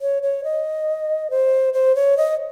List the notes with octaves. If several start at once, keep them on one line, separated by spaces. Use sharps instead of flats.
C#5
C#5
D#5
C5
C5
C#5
D#5